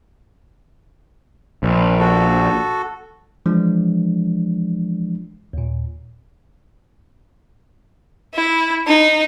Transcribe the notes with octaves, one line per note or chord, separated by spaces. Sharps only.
A#1
F#4 A4
E3 F3 G#3 D4
D#2 A#2
E4
D#4